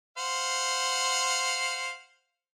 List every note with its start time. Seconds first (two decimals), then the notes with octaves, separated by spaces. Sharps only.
0.18 C5 F5 F#5